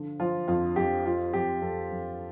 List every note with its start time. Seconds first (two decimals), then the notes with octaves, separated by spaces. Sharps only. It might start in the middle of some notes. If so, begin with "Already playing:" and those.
Already playing: D3 F3
0.20 F3 F4
0.48 F2 F4
0.76 F2 G4
1.05 F3 F4
1.33 F2 G4
1.62 F2 A4
1.91 F2